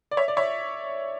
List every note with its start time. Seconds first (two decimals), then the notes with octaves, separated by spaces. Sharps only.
0.11 D5
0.17 C#5 E5
0.28 D5
0.37 C#5 E5